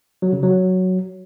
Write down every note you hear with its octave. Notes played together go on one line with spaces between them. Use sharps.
F#3
C#3
F#3